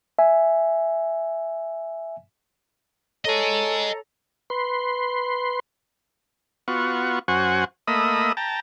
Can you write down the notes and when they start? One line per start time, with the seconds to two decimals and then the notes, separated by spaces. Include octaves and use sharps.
0.19 E5 G#5
3.25 A4 C#5 D#5 G#5 A#5
4.50 B4 C6
6.68 B3 F4 F#4 C#6
7.28 F#2 F#4 C5 F#5 G#5 C#6
7.88 A3 A#3 D#5 B5 D#6 E6
8.37 G5 A5 A#5